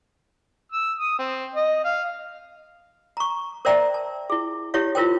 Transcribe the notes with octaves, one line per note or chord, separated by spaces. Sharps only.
E6
D#6
C4
D#5
F5
A#5 C#6
A#4 C5 D5 E5 G5 A#5
A5
E4 G#4
E4 G4 C#5 F5
E4 F4 A#4 C5 G5